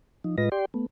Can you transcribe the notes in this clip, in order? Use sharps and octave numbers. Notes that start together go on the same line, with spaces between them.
F3 D#4
A2 G#3 F4 B4 D#5 A#6
G4 D5 G5 C6
A3 B3